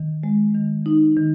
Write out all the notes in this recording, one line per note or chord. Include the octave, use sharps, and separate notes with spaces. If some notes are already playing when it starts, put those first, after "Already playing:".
Already playing: D#3
G#3
D#3
D#4
D#3